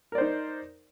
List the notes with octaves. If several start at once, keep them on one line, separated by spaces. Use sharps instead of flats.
D#4 A#4 C5 D5